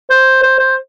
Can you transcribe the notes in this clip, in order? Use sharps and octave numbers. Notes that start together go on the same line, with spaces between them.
C5
C5
C5